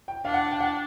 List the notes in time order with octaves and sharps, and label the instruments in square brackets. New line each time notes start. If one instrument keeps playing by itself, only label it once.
[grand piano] G5
[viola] D4 [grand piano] F5
[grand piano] F#5
G5
F#5